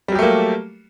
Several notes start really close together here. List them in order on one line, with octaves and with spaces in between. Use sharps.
G3 F#3 G4 A3 A#3